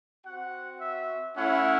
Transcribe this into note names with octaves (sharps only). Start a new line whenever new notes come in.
C4 F#4 F#5
E5
A3 C#4 E4 F#5